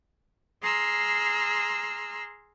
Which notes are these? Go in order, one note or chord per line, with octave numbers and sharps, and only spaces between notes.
G#4 A#5 C6 E6 F6